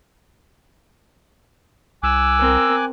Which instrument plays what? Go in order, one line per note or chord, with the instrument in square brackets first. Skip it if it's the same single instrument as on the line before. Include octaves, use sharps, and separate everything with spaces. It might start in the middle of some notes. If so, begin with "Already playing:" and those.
[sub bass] C2 [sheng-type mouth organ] G#5 D6 F#6 [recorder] E6
[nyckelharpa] C4 A#4